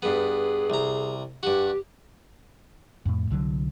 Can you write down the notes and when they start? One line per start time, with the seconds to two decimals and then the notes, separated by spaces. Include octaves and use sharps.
0.02 G2 B3 G#4
0.70 C2 A#5
1.43 G2 F#4 G4
3.06 F2 A2
3.31 C2 D3 D#3 F#3